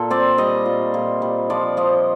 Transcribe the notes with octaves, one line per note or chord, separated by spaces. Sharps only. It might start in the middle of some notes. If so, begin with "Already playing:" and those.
Already playing: A#2 A4
C4 D5
G3 D#5
A#2
A#2
G3
F3 D5
F3 D#5